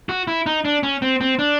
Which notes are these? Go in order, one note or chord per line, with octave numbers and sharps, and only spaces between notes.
F#4
E4
D#4
D4
C#4
C4
C4
D4